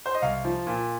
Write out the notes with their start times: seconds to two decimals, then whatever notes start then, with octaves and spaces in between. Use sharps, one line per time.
0.06 C5
0.15 D#5
0.22 C2 F5
0.45 F3
0.67 A#2